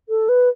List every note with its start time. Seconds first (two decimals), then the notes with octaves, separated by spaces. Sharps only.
0.09 A4
0.28 B4